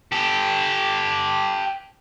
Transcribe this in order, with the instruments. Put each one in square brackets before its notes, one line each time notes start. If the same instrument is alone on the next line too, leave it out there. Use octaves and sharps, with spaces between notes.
[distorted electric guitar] G4 A4